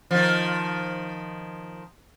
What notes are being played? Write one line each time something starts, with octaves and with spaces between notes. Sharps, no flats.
D#3 F3